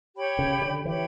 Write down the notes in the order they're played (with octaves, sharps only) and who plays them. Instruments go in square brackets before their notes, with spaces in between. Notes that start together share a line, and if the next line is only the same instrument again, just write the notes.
[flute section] G4 C#5 G5 B5
[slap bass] C#3
D3
[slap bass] E3 [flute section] G4 C#5 G5 B5